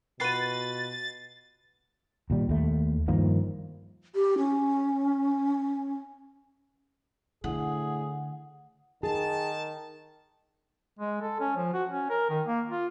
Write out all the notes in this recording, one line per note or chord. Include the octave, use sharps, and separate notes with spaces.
B2 F4 F#4 B4 A6 C7 D#7
D#2 A#2 G3
D#2 A3
G2 D#3 F3 A#3
G4
C#4
A2 D3 G#4 F#5
D#3 G#4 A5
G#3
A4
C#4
F3
F#4
C#4
A#4
D#3
A#3
F4